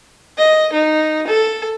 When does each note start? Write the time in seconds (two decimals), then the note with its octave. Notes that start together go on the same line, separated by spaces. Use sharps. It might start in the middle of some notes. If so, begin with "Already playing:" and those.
0.38 D#5
0.73 D#4
1.27 A4